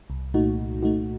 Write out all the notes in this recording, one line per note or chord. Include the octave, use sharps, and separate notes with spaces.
C2
A#2 A3 D#4 F#4
C2
A#2 A3 D#4 F#4